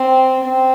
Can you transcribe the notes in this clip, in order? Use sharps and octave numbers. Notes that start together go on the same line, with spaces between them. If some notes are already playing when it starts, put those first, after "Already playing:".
Already playing: C4
C4